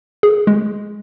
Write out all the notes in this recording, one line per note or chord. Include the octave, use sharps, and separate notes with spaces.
G#4
G#3